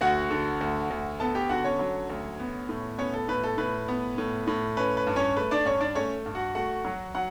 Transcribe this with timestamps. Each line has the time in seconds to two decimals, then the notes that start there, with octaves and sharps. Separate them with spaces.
0.01 D2 F#4 F#5
0.31 D3
0.61 D2
0.90 D2
1.20 B3 A4 A5
1.35 G4 G5
1.49 D3 F#4 F#5
1.64 C#4 C#5
1.79 F#3
2.10 D2
2.40 B3
2.69 A2
2.98 B3 C#4 C#5
3.13 A4
3.28 A2 B4
3.44 A4
3.58 A2 B4
3.88 B3
4.18 A2
4.47 A2
4.77 C#4 B4
4.97 B4
5.07 G2
5.16 C#4 C#5
5.37 A3 B4
5.51 D4 D5
5.65 G2 C#4 C#5
5.81 D4 D5
5.95 A3 C#4 C#5
6.26 G2
6.35 F#4 F#5
6.55 A3 F#4 F#5
6.85 F#3
7.15 F#3 F#5